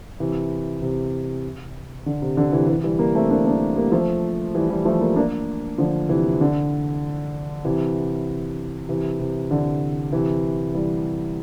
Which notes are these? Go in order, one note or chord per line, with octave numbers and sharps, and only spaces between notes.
C3 E3
C3
D3
C3
D3
C3 E3
C3 E3
E3 G3
G3 A#3
A3 C4
A#3 D4
A#3 D4
G3 A#3
F3 A3
E3 G3
E3 G3
F3 A3
G3 A#3
A#3 D4
D3 F3
C3 E3
D3
C3 E3
C3 E3
C3
D3
C3 E3
E3 G3